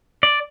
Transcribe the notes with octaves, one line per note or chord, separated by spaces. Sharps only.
D5